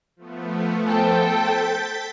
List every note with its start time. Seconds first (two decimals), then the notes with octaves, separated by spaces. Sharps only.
0.16 F3 A3 B3
0.88 A4 C5 G5
1.21 G6 A6 B6